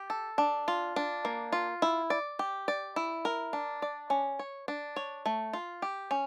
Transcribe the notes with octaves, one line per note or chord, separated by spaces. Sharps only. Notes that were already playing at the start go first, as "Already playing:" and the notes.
Already playing: G4
A4
D4
F4
D4
A#3
F4
E4
D5
G4
D5
E4
A#4
D4
D5
C#4
C#5
D4
C#5
A3
F4
G4
C#4